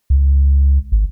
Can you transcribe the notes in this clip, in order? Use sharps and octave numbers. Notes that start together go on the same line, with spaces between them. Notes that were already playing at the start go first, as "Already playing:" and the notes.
C#2
G#1